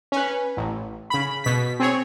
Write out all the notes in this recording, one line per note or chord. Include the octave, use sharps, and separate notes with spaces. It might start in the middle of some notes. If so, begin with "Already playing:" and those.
C#4 B4
A1
C#3 B5
B2 B6
C4 G#4 C#5